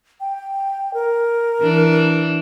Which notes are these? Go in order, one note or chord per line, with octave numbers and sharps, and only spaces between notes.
G5
A#4
E3 D4